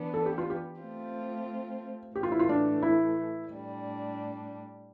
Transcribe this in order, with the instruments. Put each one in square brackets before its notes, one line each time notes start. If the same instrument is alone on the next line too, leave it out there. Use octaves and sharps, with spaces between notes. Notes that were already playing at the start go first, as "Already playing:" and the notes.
Already playing: [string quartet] E3 B3 D4
[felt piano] A4
G4
F4
G4
[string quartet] A3 C4 F4
[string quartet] A2 E3 A3 [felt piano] G4
[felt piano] F4
E4
F4
D4
E4
[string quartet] A2 G3 D4